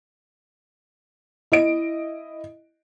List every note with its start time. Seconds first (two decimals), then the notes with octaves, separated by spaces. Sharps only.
1.52 E4 D#5 D7